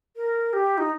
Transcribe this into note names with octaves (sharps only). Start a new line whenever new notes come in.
A#4
G4
D#4